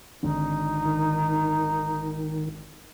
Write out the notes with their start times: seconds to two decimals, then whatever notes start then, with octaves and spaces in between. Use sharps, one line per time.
0.23 G#1 D3 D#4
0.85 D#3